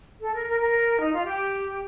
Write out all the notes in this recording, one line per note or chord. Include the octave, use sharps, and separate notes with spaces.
A4
A#4
A#4
A#4
D#4
F4
G4